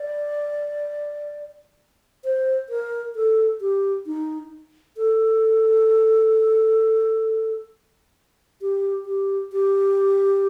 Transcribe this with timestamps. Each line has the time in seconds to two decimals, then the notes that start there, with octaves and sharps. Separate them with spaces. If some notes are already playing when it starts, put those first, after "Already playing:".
Already playing: D5
2.24 C5
2.69 A#4
3.15 A4
3.61 G4
4.06 D#4
4.97 A4
8.61 G4
9.06 G4
9.52 G4